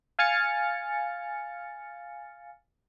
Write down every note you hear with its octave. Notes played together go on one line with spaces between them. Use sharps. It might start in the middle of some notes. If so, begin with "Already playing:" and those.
F5 G#5 F6 A6 C#7